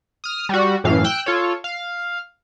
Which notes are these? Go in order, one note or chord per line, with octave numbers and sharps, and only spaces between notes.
D#6 F6
G3 F#4
F#2 A2 E3 F5
G5 E6 F#6
F4 A4 C#5
F5